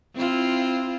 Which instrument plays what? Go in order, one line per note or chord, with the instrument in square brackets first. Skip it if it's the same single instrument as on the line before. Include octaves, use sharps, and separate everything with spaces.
[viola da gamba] C4 E4 F4